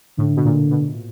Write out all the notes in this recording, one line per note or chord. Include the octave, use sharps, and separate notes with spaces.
A2 D3
B2
A#2
B2